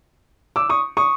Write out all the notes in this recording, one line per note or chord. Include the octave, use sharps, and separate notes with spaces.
D6 E6
C#6 D#6
C#6 D#6